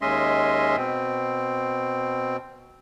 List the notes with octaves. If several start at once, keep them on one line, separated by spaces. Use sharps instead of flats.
D#2 G#3 C#4 D#5 E5 C6
B2 C4